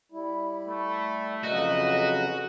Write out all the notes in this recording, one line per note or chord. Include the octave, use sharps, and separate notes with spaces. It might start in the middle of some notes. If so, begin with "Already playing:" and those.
G3 E4
A3
F2 C#3 F#3 F#4 A#4 B4 D#5